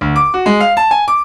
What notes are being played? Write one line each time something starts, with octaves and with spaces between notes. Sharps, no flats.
D2
D6
F#4
G#3
F5
A5
G#5
D6